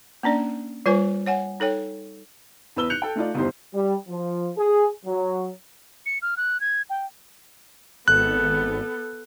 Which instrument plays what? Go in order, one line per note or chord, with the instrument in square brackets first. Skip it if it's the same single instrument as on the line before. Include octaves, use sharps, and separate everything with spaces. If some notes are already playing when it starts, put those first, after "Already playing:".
[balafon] A#3 C#4 D4 D5
G3 F4 B4 C5 G#5
C#5 F#5 G#5
D#4 A4 C#5 G5
[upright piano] E2 B4 E6 G7
F#6 G6 C#7 F7
A4 G5
A3 D#4 F4 D5
G1 E2 D#4 G4 C5
[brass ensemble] G3
F3
G#4
F#3
[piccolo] C#7
F6
F#6
G#6
G5
[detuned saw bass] G#1 [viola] B3 A4 [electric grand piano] F#6